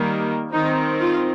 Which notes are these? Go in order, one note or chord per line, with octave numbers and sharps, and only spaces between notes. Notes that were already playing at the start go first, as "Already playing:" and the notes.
Already playing: D#3 G3 A#3
D#3 C4 D#4
F4